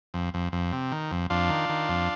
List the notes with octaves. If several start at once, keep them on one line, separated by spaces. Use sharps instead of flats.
F2
F2
F2
C3
D#3
F2
F2 D4 F4
D#3
D#3
F2